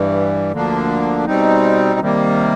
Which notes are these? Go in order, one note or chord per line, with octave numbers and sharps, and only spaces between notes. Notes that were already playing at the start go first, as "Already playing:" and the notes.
Already playing: G2 E3 G3
D2 D3 F3 A#3 D4
B2 G3 C4 D#4
C3 D#3 G3 A#3